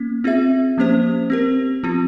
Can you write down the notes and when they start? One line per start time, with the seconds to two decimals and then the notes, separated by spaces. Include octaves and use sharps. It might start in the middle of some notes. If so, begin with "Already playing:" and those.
Already playing: A#3 C#4
0.24 C4 F4 G#4 E5
0.78 F3 A#3 C#4 G4 C5
1.30 C4 G4 A#4
1.84 F3 C4 F4